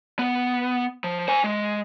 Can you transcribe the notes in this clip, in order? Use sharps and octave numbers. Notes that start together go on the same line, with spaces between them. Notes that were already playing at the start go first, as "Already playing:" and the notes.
B3
F3
C5 G#5
G#3